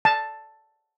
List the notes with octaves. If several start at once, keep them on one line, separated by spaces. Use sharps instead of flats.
A5